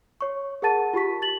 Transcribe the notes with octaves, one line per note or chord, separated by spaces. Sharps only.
C#5 C#6
G#4 A#4 F#5 A5 A6 D#7
F4 G4 C#6 B6
A6 F#7